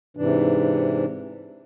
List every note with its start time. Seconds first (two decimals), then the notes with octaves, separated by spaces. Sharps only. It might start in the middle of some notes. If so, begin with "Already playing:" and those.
0.17 G#2 C3 E3 D4